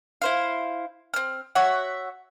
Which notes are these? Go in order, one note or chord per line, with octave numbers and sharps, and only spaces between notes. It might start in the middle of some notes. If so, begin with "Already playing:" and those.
E4 C5 F5
C4 F6
F#4 C#5 E5 F#5